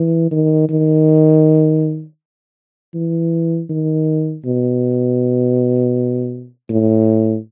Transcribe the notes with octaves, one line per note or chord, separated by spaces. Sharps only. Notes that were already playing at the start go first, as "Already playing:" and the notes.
Already playing: E3
D#3
D#3
E3
D#3
B2
A2